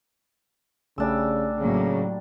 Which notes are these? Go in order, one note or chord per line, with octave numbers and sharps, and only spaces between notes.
A#1 C#3 G3 A3 D4 G#5 E6
A2 C#3 F#3 A#3